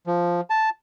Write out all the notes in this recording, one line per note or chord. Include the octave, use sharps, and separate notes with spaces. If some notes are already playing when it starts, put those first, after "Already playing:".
F3
A5